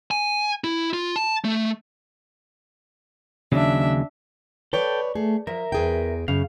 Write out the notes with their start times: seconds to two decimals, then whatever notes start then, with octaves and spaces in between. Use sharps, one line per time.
0.11 G#5
0.64 E4
0.94 F4
1.16 A5
1.45 A3
3.52 D#2 C#3 F#3 D4 E5
4.73 A4 B4 C#5 D5 G5
5.15 A3 G#4
5.47 F3 A#4 E5
5.72 E2 G#4 G5
6.28 F#2 C#3 F5